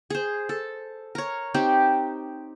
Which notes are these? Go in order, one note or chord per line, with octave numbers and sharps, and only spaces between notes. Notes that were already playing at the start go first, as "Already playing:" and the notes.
G#4 C5
A4
A#4 C#5
C4 D#4 G4